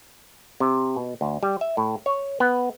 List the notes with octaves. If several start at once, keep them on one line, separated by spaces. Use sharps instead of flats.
C3
B2
D2
G3
E5
A2
C#5
B3